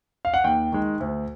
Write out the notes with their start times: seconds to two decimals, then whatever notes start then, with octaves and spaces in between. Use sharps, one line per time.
0.25 F5
0.34 F#5
0.44 D#2 G5
0.72 D#3 G#3
1.00 D2